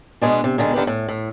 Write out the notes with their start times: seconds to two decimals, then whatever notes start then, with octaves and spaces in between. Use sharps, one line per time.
0.21 B2 G#3 D4
0.44 C3
0.58 B2 D3 D#3 G#3
0.74 D3 D#3 G4 B4
0.87 A2
1.08 A2